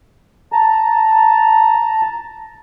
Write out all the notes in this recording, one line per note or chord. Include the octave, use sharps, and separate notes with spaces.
A5 A#5